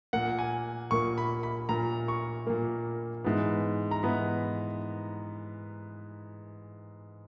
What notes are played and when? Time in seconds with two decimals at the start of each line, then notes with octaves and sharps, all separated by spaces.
0.13 A#2 A#3 F#5
0.39 G#5
0.91 A#2 A#3 C#6
1.18 B5
1.43 B5
1.69 A#2 A#3 A#5
2.08 C#6
2.47 A#2 A#3
3.24 G#2 E3 B3
3.91 A#5
4.03 G#2 E3 B3 B5